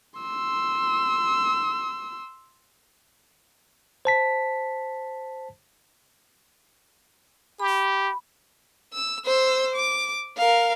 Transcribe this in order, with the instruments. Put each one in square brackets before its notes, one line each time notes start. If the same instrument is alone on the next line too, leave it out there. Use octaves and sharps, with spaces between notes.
[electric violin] C6 E6
[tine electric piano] C5 A5 B6
[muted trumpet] G4 [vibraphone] B5
[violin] E6
C5 E6
D6
A#4 F5